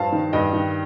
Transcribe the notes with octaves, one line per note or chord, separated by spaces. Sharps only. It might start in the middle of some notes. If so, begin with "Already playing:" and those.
Already playing: G2 F3 F5 A5
D#3
G2 D#5 G5
D#3